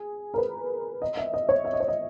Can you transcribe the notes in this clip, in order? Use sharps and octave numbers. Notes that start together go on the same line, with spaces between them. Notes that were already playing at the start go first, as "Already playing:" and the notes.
Already playing: G#4
A#4
B4
D#5
E5
D#5
C#5
E5
D#5
C#5
D#5